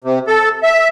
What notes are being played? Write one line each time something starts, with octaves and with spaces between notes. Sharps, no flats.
C3
A4
E5